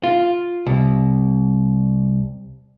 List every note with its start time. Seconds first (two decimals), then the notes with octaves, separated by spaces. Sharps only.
0.03 F4
0.66 C2